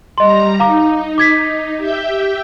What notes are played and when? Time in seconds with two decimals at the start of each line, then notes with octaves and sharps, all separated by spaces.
0.18 G3 D#5 A#5 C6
0.60 D#4 F5 A#5 D6
1.18 D6 G#6 B6
1.77 G4 E5 G5